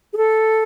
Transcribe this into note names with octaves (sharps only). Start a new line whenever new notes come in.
G#4
A4